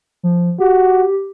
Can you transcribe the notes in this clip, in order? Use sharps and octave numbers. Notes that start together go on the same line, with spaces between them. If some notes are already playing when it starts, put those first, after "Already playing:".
F3
F#4 G4